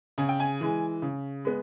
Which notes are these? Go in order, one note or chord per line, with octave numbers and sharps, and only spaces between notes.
C#3 G#5
G5
G#5
E3 G#3
C#3
G#3 B3